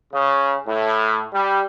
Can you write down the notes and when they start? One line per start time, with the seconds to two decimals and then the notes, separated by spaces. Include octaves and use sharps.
0.13 C#3
0.67 A2
1.34 G3